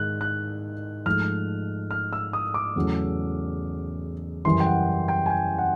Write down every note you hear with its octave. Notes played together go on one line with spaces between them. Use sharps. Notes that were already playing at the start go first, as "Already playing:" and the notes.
Already playing: G#2 D#3 G#3 F#6
F#6
G#2 F3 A3 F6
F6
E6
D#6
D6
E2 C#3 F#3 A3
F#2 C#3 E3 G3 C6
G5
F#5
G5
G#5
G5
F#5